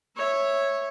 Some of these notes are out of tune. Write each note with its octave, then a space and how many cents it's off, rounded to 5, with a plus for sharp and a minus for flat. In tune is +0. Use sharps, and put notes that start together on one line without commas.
C#5 -10 E5 +0